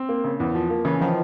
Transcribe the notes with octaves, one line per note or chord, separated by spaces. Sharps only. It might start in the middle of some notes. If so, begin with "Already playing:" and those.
Already playing: C4
A#3
C#3
E2
F3
A#3
C#3 E3
D#3 F3